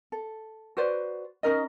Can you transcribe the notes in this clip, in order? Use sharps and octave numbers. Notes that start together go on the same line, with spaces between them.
A4
F#4 B4 C5 D5
C#4 D#4 A#4 D#5